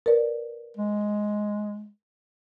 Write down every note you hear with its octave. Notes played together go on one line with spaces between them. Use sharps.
A#4 B4 D5
G#3